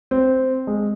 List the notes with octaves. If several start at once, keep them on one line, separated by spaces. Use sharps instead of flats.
C4
G#3